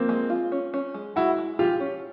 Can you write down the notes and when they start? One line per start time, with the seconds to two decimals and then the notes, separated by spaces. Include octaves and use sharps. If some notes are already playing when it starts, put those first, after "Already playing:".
Already playing: F3 A#3 C4
0.09 G#3
0.30 F4
0.52 C#4
0.74 C#4
0.94 G#3
1.16 G#3 E4 F#4
1.38 G#3
1.59 F3 F4 G4
1.80 C#4